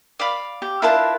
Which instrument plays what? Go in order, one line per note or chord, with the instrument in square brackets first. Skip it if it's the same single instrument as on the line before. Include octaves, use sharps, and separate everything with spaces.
[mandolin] D5 F5 B5
[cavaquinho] G4
[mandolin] D4 A#4 A5 [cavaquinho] E4 F4 B4